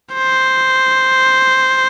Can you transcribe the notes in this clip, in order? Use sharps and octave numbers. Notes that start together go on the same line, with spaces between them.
C5